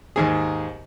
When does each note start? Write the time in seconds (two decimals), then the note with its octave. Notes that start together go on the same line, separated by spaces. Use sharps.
0.16 D#2 G#2 G#4